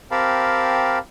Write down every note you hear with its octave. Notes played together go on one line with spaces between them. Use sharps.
C4 G4 A#4 F5 A5 B5